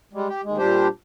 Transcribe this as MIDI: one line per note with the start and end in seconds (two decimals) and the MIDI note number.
0.13 0.28 55
0.13 0.28 56
0.28 0.41 67
0.44 0.58 39
0.44 0.58 56
0.58 0.87 46
0.58 0.87 55
0.58 0.87 62
0.58 0.87 67
0.58 0.87 72